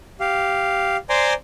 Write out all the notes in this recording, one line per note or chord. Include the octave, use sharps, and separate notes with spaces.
G4 F5
C5 D5 G#5 A#5 C6 D6